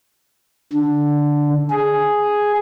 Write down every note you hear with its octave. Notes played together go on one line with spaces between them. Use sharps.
D3
G#4